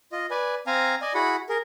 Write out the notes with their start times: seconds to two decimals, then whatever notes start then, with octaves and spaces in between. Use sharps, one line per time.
0.12 F4 D#5
0.31 B4 D5 G#5
0.67 C4 F5 G#5 A#5
1.01 D5 D#5 G#5
1.14 E4 F#4 G#4 F#5 B5
1.49 G#4 A#4